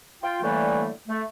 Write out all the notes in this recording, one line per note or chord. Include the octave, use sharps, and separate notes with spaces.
F4 G5
A2 D3 E3 G3 A3 A#3
A3